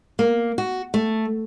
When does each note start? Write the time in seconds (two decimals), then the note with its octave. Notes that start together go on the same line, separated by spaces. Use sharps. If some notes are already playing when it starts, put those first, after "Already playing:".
0.19 A#3
0.58 F#4
0.94 A3